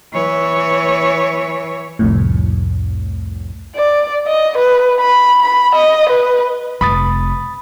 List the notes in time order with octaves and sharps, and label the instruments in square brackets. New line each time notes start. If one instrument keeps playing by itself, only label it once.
[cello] E3 C#5
[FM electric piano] C2 F2 A2
[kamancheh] D5
D#5
B4
B5
B5
D#5
B4
[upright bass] F1 [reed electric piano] B5 D#6 A6